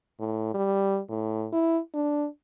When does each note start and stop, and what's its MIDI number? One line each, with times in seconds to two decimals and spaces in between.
0.19 0.52 45
0.54 0.99 55
1.09 1.47 45
1.53 1.79 64
1.94 2.27 62